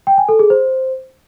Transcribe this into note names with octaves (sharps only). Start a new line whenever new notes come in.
G5
G#5
A4
G#4
C5